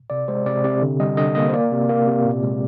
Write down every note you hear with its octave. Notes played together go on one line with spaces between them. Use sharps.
C3 D5
G#3 C5
C3 D5
C3 D5
D3
G3 D#5
D3 D#5
A#3 D#5
C5
A#3 D5
C3
A#3
C3
A#2
G#3